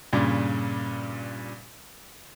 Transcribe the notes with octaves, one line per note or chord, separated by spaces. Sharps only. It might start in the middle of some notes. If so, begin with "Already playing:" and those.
G2 A#2 C#3